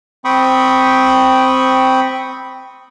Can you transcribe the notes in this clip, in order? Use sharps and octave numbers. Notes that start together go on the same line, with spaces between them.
C4 G5 B5 C#6 D#6